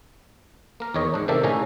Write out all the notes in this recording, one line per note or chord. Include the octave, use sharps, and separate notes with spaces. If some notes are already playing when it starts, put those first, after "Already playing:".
A#3 A#4
E2 D#3 C#5 D#5
G#2 D4
C3 D#3 A#3 A4 D5 E5
A2 C#3 C#4 D#4 G#5 A#5